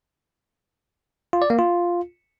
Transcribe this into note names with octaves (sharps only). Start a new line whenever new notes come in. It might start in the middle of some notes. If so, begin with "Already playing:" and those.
F4
D5
A#3
F4